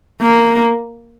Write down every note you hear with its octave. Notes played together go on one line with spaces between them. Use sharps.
A#3